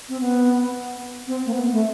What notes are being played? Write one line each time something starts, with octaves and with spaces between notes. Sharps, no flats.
C4
B3
C4
A#3
B3
A3